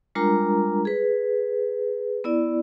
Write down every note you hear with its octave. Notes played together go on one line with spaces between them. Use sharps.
G3 G#3 D4 F4 A#4 A#5
G#4 B4
B3 E4 D5